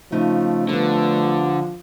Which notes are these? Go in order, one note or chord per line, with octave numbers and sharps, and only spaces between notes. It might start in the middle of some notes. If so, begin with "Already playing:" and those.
C#3 F3 A3 D#4
D3 F3 G3 B3